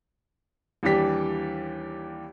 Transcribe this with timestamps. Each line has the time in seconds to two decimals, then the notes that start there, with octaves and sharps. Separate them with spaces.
0.83 D#2 E3 G3 D4 G4 B6